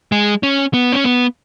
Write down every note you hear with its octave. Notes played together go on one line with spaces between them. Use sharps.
G#3
C#4
B3
C#4
B3